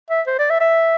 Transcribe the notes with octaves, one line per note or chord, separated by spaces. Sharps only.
E5
C5
D5
E5
E5